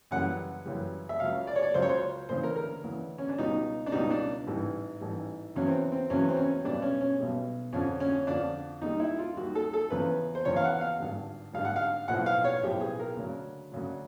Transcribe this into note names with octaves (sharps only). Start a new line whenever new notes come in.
F#2 C#3 E3 G3 F#5
F#2 C#3 E3 G3
E5
C#2 C#3 F#3 F5
D5
C#5
D5
C#2 C#3 F#3 C5
C#5
C5
D2 C#3 E3 C5
A#4
A#4
D2 C#3 E3
C#4
D4
C#2 B2 G3 D#4
D4
C#2 B2 G3 D#4
D4
A1 G#2 E3 G3
A1 G#2 E3 G3
E2 C#3 F#3 C#4
C4
C4
E2 C#3 F#3 C#4
C4
C#4
B1 B2 G3 D4
C#4
C#4
B1 B2 G3
F2 D3 F3 C#4
C#4
F2 D3 F3 D4
D#2 D#3 G3 D#4
E4
F4
D#2 D#3 G3 F#4
A4
A4
E2 C#3 F3 B4
C5
E2 C#3 F3 C#5
F5
F#5
F5
G#1 G2 D3 G3
G#1 G2 D3 G3 F5
F#5
F5
B1 A2 F3 F#5
F5
C#5
B1 A2 F3 G4
G#4
A#4
D2 C#3 F#3
D2 C#3 F#3